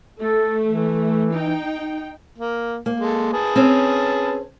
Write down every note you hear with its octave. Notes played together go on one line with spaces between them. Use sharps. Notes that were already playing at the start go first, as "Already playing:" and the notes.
A3 A4
E3
D#4 G5
A#3
A#3
G#3 A4
G#4 B4 A5
C4 C#4